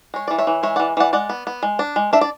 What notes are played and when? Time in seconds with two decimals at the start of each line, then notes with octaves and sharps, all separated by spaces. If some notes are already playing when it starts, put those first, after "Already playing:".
0.14 G#3 C#5
0.28 E3 D5
0.38 C#5 E5
0.47 E3
0.63 G#3 C#5 E5
0.76 E3 D5 F#5
0.97 E3 D5 F#5
1.13 G#3 D5 F#5
1.29 B3
1.47 B3
1.63 G#3
1.79 D4
1.96 G#3
2.13 D4 E5
2.21 D5